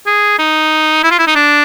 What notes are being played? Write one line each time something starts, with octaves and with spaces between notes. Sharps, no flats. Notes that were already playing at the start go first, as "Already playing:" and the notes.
G#4
D#4
E4
F4
E4
D#4
D4